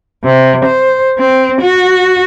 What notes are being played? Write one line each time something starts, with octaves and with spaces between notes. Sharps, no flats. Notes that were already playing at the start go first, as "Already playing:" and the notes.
C3
C5
C4
F#4